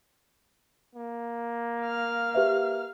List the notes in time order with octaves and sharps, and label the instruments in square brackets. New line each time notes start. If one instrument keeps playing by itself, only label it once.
[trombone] A#3
[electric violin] F5 F6
[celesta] G4 B4 E5